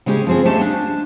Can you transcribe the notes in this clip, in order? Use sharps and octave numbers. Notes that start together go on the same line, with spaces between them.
C#3 G#3 C#4 G4 G#4
F3 C4 G#4
A3 C#4 G4 D#5 F5 A5
D4